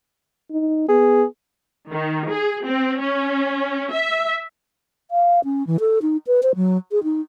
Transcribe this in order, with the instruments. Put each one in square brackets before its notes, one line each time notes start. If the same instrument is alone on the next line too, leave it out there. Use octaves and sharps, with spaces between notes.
[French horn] D#4
[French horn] B3 [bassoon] G#4
[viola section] D#3
G#4
C4
C#4
E5
[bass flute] F5
C#4
E3
A4
D#4
B4
C5
F#3
G#4
D#4